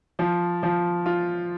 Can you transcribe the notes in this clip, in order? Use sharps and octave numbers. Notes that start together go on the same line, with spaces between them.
F3
F3
F4